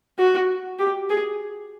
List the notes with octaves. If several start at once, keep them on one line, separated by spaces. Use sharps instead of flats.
F#4
G4
G#4